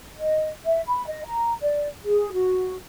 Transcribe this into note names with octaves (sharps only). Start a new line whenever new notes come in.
D#5
E5
B5
D#5
A#5
D5
G#4
F#4